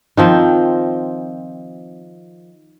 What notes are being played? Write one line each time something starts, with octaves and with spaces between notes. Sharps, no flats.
D#3 F3 C4